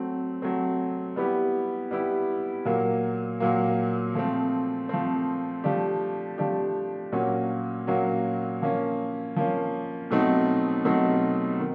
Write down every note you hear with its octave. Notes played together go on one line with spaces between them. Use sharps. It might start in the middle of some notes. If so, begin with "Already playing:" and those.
Already playing: F#3 A3 C4
F#3 A3 C4
G3 B3 E4 G4
G3 B3 E4 G4
A#2 F#3 A#3
A#2 F#3 A#3
F3 A3 C4
F3 A3 C4
F3 A3 D4 G4
F3 A3 D4 G4
A#2 F#3 A#3 C#4 F#4
A#2 F#3 A#3 C#4 F#4
F3 A#3 C#4
F3 A#3 C#4
B2 F#3 A3 C4 D#4
B2 F#3 A3 C4 D#4
D#3